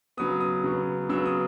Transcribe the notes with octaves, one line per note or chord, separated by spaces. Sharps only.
C#3 F#3 B3 D#6
D#6
C#3 F#3 B3
C#3 F#3 B3 E6
D#6